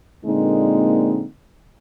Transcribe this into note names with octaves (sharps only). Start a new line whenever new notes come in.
A#2 D3 G#3 A#3 C4 D#4